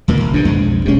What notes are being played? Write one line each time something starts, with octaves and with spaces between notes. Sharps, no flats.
D#2 A#2 A#3
F#1
B1 G2 C#3 F3 D4
F2 G#3
E1 B1 C3 G#3 C#4